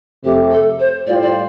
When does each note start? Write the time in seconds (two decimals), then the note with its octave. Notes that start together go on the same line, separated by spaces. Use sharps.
0.24 F2 C3 A3 G4
0.51 A4
0.80 C5
1.07 A2 G3 F4 C5 D5
1.22 D5